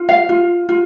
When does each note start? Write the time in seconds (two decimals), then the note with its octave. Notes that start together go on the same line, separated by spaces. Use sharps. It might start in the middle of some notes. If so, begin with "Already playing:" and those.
Already playing: F4
0.09 F5
0.29 F4
0.69 F4